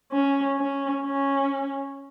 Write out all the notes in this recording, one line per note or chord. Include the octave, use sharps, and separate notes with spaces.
C#4
C#4
C#4